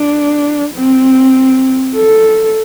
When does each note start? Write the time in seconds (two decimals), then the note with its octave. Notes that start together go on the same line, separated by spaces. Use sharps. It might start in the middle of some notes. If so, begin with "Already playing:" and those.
Already playing: D4
0.75 C4
1.96 A4